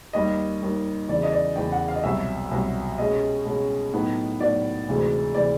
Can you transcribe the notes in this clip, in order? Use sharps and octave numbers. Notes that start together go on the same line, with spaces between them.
D#2 D#3 G3 D#5
D#2 D#3 G3
E2 C#3 E3 D5
D#5
D5
E2 C#3 E3 G5
F#5
F5
D#5
C2 B2 F#3 E5
C2 B2 F#3
B2 G#3 C#4 D#5
B2 G#3 C#4
A2 F#3 B3 D#4
A2 F#3 B3 D#4 D5
D2 C3 E3 G#3
C3 E3 G#3 D5